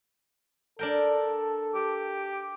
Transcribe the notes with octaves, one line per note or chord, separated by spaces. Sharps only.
D4 A4 A#4 G5
G4